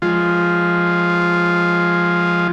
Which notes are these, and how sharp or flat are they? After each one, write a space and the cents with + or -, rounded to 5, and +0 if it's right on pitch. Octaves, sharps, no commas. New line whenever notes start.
F3 +0 G#3 +0 F4 +0